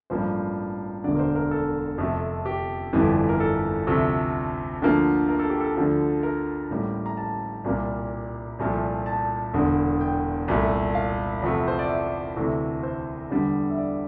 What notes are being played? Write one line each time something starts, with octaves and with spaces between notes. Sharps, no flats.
A1 G2 F3 A#3 C5
E1 D2 D3 D5
A#4
C5
A#4
A4
F2 C3 F3 A3
G4
G1 F2 E3 G3
A#4
A4
D2 C3 F3 A3
D2 D3 F3 A#3
A#4
A4
G4
A4
D2 D3 F3
A#4
A1 A2 G3 A#3
A#5
A5
C2 A#2 G3 A#3
C2 A#2 F3 A3
A5
E1 E2 D3
G5
C2 A#2 A3
F5
E2 C3 F3 A3
C5
D5
E5
D2 C3 E3 A3
C5
E2 D3 G3
E5
D5